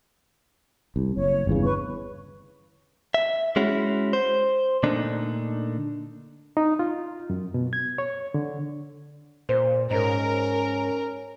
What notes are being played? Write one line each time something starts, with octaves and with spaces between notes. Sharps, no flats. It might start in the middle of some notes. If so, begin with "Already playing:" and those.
C2
F#1 C#5
G1 E2 C#3
B4 C#6
E5
G#3 C#4 E4 F#4
C5
A#2 D3 A3 D4 D#4
D#4
F4
F#2
B2
G#6
C#5
D3
A#2 C5
G#2 C#4 A#4 D#5